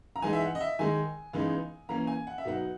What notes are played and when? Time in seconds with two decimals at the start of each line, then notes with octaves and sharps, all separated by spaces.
0.16 A#5
0.22 E3 G#3 D#4 G#5
0.33 E5
0.41 F#5
0.55 D#5
0.61 E5
0.79 D#3 G#3 D#4 G#5
1.33 C#3 E3 G#3 B3 D#4
1.89 E3 A#3 C#4 A#5
2.07 G#5
2.27 F#5
2.38 E5
2.45 B2 F#3 B3 D#4 F#5